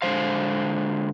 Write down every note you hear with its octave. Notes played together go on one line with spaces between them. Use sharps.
D3 G#3 C5 F5